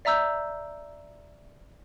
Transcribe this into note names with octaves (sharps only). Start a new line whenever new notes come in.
D5 E5 A#5 E6 G6